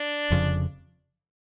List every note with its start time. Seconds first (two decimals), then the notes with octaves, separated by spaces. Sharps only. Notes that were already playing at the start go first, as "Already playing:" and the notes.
Already playing: D4
0.30 F1 F2 C#3 F3